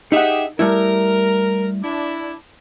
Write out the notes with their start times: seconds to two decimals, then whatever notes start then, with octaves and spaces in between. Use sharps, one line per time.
0.12 D#4 G4 G#4 E5 F#5
0.59 G3 A3 E4 A#4
1.83 D4 E4